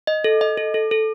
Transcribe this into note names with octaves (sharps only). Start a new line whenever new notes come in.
D#5
A4
D#5
A4
A4
A4